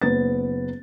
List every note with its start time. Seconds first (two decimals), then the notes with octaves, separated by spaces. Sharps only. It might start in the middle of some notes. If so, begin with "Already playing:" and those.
0.02 F#1 B3 A6